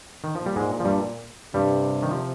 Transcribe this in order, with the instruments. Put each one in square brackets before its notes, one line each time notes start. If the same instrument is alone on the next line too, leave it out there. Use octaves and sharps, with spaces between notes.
[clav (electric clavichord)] D#3
F3
[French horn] A#2 [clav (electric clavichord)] G3
[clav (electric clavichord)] G#2 G#3
F3
G2 G3
[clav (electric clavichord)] G2 G3 [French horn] C3
[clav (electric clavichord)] D#3
F3